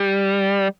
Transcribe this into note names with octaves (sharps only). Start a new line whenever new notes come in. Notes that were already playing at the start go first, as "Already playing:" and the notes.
Already playing: G3